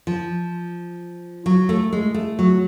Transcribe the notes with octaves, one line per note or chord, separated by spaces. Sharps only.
F3
F#3
A3
G#3
A3
F#3